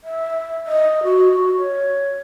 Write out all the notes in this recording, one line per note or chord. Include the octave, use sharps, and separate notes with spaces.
E5
D#5
F#4
F#4
C#5